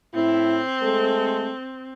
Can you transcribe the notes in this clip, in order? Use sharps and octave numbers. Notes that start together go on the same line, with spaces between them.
A2 C4 E4
G#3 A3 A4